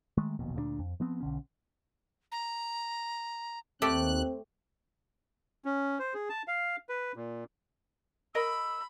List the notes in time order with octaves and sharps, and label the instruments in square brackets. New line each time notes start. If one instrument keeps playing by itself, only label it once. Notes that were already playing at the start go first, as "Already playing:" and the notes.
[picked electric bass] D#3 G#3 A3
E1 A#1 D#2 B2
D2 A#2 G#3 D4
F2
F3 B3 C4
B1 D3 C#4
[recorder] A#5
[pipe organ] D#2 F#6 [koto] A3 G4 D5 [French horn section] C4
[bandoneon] C#4
C5
G#4
A5
F5
B4
A#2
[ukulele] A#4 D#5 [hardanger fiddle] B5 [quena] E6